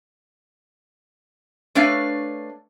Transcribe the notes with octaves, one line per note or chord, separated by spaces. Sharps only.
A3 D4 B4 C#5 F5